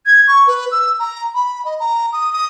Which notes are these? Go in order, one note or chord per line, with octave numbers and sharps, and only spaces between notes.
G#6
C#6
B4
E6
A#5
B5
D#5
A#5
D#6
D#6